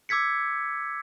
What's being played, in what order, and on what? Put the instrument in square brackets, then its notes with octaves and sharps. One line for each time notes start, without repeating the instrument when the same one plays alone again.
[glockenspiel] D6 E6 G#6 B6 C#7